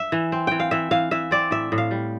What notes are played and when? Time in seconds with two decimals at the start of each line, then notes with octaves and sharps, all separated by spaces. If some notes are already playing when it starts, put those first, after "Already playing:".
Already playing: E5
0.12 E3
0.32 C4
0.47 E3 G5
0.60 F5
0.71 E3 E5
0.91 E3 F5
1.11 E3 E5
1.31 C4 D5
1.51 A2 E5
1.72 A2
1.78 F5
1.91 G3